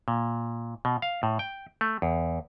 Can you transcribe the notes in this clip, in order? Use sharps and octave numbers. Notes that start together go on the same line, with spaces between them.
A#2
B2
F5
A2
G5
A3
E2